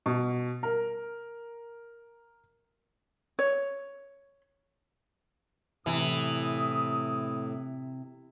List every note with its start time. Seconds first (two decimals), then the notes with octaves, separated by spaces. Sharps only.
0.06 B2
0.63 A#4
3.39 C#5
5.86 A2 C3 E3 D#6